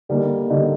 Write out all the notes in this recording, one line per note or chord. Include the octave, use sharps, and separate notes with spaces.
D3 G3 A#3 D#4
D3 G3 A#3 D#4